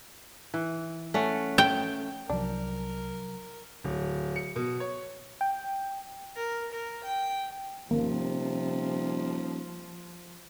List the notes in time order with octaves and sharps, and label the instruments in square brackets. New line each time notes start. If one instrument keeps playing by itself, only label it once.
[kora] E3
A3 C#4 F#5
[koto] G5
[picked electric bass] C2 F3 [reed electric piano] C3 F#3 [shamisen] D4 [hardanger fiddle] A#4
[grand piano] D1
C#7
B2
C#5
[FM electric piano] G5
[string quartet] A#4
A#4
G5
[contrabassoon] D#1 [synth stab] G#1 A#3 [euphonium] C3 [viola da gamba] F3